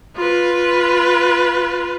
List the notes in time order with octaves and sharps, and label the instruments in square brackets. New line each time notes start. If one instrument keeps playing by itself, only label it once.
[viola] F4 B4